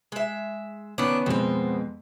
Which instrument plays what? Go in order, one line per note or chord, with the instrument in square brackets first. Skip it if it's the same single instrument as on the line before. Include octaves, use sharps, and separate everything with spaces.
[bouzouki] G#3 E5
[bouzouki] D#3 D4 [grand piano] B3 C#4
[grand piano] F2 G#3 B3 [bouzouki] B2 C4